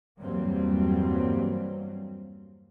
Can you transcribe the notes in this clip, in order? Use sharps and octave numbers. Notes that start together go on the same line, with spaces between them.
E2 G2 F#3 G3 A#3 C4